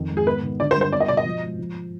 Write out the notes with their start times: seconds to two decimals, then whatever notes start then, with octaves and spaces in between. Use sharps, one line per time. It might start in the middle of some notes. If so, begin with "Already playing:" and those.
Already playing: F2 D#3
0.10 G#2
0.17 G#4
0.26 B3 B4
0.43 D#3
0.60 D3 D5
0.71 C5
0.76 G2
0.81 C5
0.92 B3 D5
1.00 D#5
1.08 B2 D5
1.17 D#5
1.26 F3
1.42 G#2
1.59 F3